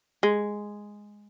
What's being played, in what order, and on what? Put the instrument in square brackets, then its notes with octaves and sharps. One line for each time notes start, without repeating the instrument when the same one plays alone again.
[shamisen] G#3